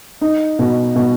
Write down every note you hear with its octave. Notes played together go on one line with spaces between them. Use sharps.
D#4
B2
B2